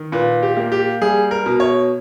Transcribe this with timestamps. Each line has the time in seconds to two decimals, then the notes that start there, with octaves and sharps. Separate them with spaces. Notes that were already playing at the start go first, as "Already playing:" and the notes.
Already playing: D#3
0.12 A#2 B4
0.43 G4
0.57 A#3
0.72 G4
1.01 G3 G#4
1.31 A#4
1.46 B2
1.60 C#5